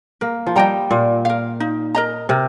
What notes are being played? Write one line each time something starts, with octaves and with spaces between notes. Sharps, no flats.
A#3 A#4
F3
G3 D#5 G5 A#5
A#2 F4
A#4 F5
D#4
A#4 D#5 A#5
C3 A#4